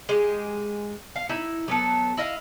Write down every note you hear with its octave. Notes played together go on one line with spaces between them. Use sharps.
G#3 G4
F5
D#4 E4
F#3 B3 A4
E4 D#5 F5